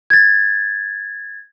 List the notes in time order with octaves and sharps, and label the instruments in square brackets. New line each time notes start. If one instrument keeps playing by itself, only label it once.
[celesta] G#6 A6